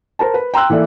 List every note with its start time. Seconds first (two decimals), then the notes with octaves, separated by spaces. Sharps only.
0.19 A#4 C5 A5
0.34 B4
0.54 G5 A#5 C6 E6 F#6
0.70 E3 A#3 A4 D5 E5